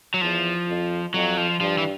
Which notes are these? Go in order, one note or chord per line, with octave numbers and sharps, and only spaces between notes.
F#3
E2 F3
F2
F2 F#3
F3
G2 F3
E3